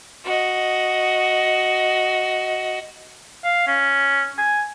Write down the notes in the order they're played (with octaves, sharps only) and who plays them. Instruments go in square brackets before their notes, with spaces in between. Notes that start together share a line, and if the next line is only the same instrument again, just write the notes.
[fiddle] F#4 D#5
[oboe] F5
C#4
G#5